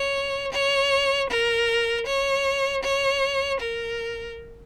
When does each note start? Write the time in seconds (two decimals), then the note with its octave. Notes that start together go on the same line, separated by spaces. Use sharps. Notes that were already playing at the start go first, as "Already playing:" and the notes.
Already playing: C#5
0.53 C#5
1.30 A#4
2.06 C#5
2.83 C#5
3.60 A#4